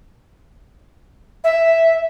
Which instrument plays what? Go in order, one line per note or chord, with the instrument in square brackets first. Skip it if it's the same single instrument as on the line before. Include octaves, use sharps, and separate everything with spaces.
[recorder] E5